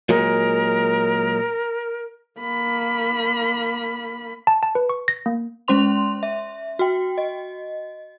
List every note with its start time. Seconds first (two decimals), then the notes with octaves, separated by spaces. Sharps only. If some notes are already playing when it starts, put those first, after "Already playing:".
0.09 A#2 F#3 G#3 A#4
2.40 A#3 B5
4.47 A5
4.63 A5
4.75 B4
4.89 C#6
5.08 A#6
5.26 A#3
5.68 G#3 C#4 C5 C6 F7
6.23 E5
6.79 F#4 G5
7.18 D#5